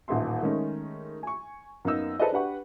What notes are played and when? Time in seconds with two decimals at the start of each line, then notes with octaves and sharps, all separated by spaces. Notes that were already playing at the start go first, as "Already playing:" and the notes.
0.08 D#1 A1 D#4 E5 C6
0.42 D#3 G#3 A3 C#4 D#4
1.23 G#5 C#6
1.85 F#2 A#3 B3 D#4 E6
2.19 G#4 A4 B4 C5 D5 D#5
2.32 D4 G4 B4 F#5 C#6